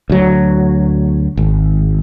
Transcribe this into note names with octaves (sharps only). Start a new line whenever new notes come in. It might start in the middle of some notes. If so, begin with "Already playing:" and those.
D2 F#3
G#1